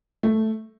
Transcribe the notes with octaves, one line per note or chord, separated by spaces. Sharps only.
A3